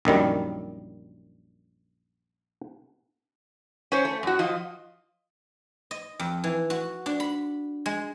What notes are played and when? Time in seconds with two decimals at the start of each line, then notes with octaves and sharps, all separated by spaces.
0.05 A#1 F#2 D#3 G3
3.92 C#4 C5 C#5
4.05 A3
4.23 F#2 F#4
4.39 F3 F4 D#5
5.91 D#5
6.20 F2
6.44 E3
6.70 F#4
7.06 D4
7.20 B5
7.86 G#3